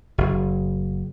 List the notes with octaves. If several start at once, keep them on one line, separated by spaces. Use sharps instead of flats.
F#1